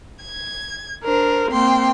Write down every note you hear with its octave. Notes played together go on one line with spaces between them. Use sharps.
G#6
D4 A#4 C5
A#3 C4 G5 C6